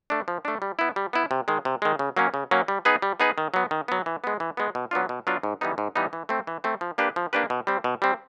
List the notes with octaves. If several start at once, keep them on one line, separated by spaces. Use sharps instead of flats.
A3 D4
F3
A3 D4
G3
B3 E4
G3
B3 E4
C3
D#3 G#3
C3
D#3 G#3
C#3
F#3 A#3 C#4
C#3
F#3 A#3 C#4
G3
B3 D#4 G#4 B4
G3
B3 D#4 G#4 B4
D#3
F#3 B3
D#3
F#3 B3
E3
G#3 B3
E3
G#3 B3
B2
F#3 B3 D4 F4
B2
F#3 B3 D4 F4
G#2
E3 G3 B3 D#4
G#2
E3 G3 B3 D#4
E3
A3 C4
E3
A3 C4
F3
A#3 D4 G4 B4
F3
A#3 D4 G4 B4
B2
G3 C4
B2
G3 C4